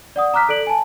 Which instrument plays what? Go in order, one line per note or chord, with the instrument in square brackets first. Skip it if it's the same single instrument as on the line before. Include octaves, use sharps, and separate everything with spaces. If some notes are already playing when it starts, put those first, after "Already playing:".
[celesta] D5 F#5 D#6
A#5 D6 F6 F#6 B6
A4 D5 D7 F#7
G#5 A5